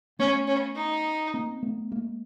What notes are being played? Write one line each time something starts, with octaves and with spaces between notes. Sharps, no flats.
A3 B3 C#4
C#4
D#4
A#3 C4
A3 B3
G#3 A#3